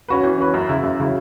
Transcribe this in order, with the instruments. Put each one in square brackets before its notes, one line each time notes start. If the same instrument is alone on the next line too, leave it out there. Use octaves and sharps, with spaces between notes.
[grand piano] C#4 F#4 B4
E3
C#4 F#4 B4
F#2
C#3 F#3 E4
F#2
C#3 F#3 E4